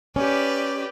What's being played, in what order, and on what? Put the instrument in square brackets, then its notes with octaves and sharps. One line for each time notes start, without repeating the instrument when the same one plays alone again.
[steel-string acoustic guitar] C#4 [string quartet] G4 B4 D5